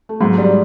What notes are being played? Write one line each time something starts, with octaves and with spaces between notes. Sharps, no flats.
A3
G#2 F#3 G#3
G3